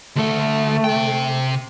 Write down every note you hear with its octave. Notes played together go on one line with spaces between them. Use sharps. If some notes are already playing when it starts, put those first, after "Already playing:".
D2 A3 A4
C3 G5